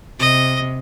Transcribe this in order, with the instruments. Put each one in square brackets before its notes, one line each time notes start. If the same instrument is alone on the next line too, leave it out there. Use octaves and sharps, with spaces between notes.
[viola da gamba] C3 [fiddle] D#5